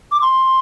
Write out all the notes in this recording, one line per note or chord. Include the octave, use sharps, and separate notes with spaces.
D6
C6